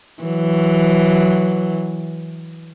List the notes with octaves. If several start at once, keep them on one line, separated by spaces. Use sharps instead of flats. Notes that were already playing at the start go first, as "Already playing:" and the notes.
E3 F#3